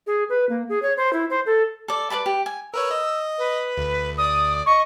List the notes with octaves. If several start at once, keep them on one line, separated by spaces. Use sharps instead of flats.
G#4
B4
A#3
G#4
C#5
C5
E4
C5
A4
A4 D5
B4 D5 A5 B5
G4
G#5
A#4 B4 C#5 E6
D#5
B4
D2
D5 D#6
D#5 C#6